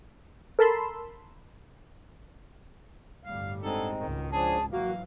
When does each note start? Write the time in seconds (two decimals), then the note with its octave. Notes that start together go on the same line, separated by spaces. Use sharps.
0.59 A4 A#4 A5 B5 C6 E6
3.25 G1 A2 G3 F5
3.63 D3 G#3 C4 D#4 G#4 A4
4.00 G#1 C#2 D#3
4.32 F3 C#4 D4 G#4 A5
4.72 E3 F#3 A#3 F#4 F5